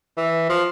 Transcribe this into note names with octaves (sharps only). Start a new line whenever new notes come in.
E3
F3